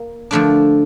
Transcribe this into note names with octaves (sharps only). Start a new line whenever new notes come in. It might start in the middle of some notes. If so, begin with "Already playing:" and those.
Already playing: A#3
D3 F3 A3 D4